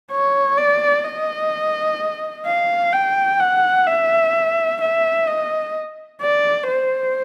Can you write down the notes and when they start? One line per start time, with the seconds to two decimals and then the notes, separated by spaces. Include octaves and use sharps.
0.12 C#5
0.58 D5
1.05 D#5
2.46 F5
2.93 G5
3.40 F#5
3.87 E5
4.81 E5
5.27 D#5
6.22 D5
6.69 C5